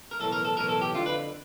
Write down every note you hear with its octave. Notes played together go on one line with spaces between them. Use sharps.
A#4
B1 A2 E3 A4
A#4
A4
B1 A2 E3 A#4
A4
G4
F2 D3 F4
B4